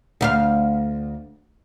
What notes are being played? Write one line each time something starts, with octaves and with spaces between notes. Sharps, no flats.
D2 E4 F5